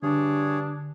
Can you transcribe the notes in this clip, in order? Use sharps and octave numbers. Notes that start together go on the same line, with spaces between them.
G2 D3 D4 G#4 C#5